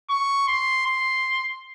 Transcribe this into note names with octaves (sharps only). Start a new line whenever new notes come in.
C#6
C6
C6